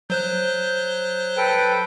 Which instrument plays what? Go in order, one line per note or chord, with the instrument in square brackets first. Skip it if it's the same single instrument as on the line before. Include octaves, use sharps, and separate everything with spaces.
[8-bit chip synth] F#3 C5 F#6 [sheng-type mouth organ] G6
[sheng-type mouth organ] A4 B4 G5